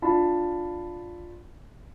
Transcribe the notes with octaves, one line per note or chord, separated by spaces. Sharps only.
D4 F4 A5 B5